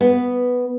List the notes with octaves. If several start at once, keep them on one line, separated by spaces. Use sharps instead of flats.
B3